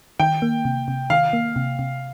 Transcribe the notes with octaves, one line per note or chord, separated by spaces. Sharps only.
D#3 G5
A#3
C3
C3
D#3 F5
A#3
C3
C3